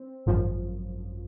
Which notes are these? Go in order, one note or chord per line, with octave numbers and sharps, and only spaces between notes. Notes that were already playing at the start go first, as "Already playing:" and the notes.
Already playing: C4
G#1 F#2 F3